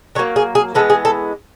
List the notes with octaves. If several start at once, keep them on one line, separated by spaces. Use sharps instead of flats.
D3 F#3 A#3 C#5
G#4
G#4
E3 G#3 B3 A4
G#4
A4